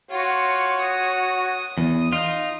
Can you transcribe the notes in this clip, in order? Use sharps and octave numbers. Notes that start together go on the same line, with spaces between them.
F4 F#4 C#5
D#6
E2
D#4 F4